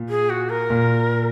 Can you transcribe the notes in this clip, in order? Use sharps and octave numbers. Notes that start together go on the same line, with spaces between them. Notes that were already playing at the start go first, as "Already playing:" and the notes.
Already playing: A#2
G#4
F#4
A#4
A#2